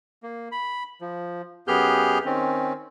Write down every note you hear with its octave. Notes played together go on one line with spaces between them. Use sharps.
A#3
B5
F3
F#2 B3 G4 G#4 F6 G6
D#3 C4 C#4